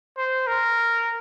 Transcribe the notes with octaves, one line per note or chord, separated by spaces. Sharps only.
C5
A#4